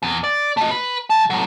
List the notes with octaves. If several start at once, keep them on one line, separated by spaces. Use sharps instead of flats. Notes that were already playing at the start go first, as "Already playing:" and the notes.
E2
D5
A3 D#5
B4 B5
F#3 A5
A2 F#3